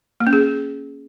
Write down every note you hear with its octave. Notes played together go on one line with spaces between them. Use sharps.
A#3
C#4
G#4